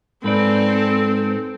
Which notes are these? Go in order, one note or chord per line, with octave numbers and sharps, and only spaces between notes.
G#2 C4 A4 B4 D5